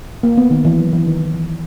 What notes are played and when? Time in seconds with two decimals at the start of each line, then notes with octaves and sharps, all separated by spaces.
0.23 A#3
0.38 B3
0.51 D#3
0.65 E3
0.79 F#3
0.93 E3
1.07 D#3
1.21 D#3
1.34 E3